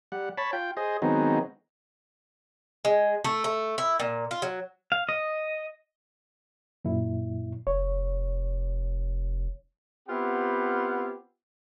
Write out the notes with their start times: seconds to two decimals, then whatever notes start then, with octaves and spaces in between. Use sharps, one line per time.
0.12 G3 F#5
0.38 C#5 A5 B5
0.53 F4 G5
0.77 G#4 C5 D#5
1.02 D#3 F#3 G#3 B3 C4 D#4
2.85 G#3
3.24 A3
3.44 A3
3.78 E4
4.00 A#2
4.31 F4
4.42 F#3
4.92 F5
5.09 D#5
6.85 F#2 A#2 E4
7.67 F1 C#5
10.08 B3 C4 E4 F4 G4 F#5